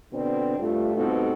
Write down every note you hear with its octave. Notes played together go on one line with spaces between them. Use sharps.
B2 D3 C4 D4
G2 A3 F4
G2 B2 A3 C4 D#4 A4